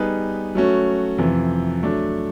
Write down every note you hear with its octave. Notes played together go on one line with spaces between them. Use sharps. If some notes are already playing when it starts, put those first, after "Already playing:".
Already playing: G3 B3 D#4 G#4 B4
F#3 A3 C#4 F#4
F2 C3 E3
F#3 A3 D4